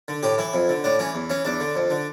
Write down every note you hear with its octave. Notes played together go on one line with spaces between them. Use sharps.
D3
A2 G4
E3 E4
F2
D3
A2 D4
E3 C#4
E2
E3 C#4
E2 D4
D3
F2
D3